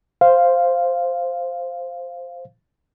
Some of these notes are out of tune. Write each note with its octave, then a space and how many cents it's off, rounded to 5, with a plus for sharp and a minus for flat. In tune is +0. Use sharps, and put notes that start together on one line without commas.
C5 +0 F5 -5